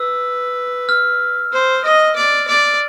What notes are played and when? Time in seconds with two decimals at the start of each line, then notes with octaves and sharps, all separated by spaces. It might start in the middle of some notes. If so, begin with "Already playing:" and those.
Already playing: B4 E6
0.89 F6
1.52 C5
1.84 D#5
2.16 D5
2.47 D5